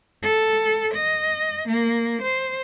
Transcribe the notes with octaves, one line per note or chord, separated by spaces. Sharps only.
A4
D#5
A#3
C5